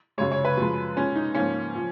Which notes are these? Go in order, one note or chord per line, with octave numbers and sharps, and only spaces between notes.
F#2 C#3 G#3 C#5
C#5
B4
F#2 F3 G#3
A#2 G#3 C#4
D#4
G#2 F3 A#3 C#4
A#2 F3